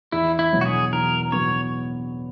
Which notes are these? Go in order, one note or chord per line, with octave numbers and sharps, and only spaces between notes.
E2 E4
E4
B2 F#3 B3
F#4
G#4
E2 A#4
B2 F#3 B3 C#5